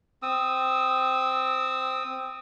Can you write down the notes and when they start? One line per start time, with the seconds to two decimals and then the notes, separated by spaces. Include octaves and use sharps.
0.22 C4 D#6 E6